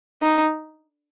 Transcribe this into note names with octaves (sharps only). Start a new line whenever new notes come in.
D#4